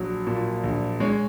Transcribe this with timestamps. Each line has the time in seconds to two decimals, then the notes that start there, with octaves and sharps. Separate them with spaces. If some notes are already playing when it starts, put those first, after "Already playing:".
Already playing: A#1 F#3
0.27 A#2
0.64 A#1
1.00 G#3 C#5